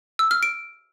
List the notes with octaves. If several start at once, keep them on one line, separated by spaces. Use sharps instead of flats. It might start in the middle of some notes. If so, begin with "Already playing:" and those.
E6
F6
D7